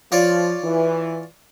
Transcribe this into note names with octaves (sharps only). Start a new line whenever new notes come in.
F3 F4 C#5 D5
E3